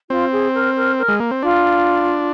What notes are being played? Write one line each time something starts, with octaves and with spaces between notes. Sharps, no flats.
C4 F4
G#4
A#4
A#4
A#4
G#3
A#3
C4
D4 F4